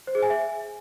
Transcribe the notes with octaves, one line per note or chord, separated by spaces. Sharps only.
C5
G#4
G#5
E5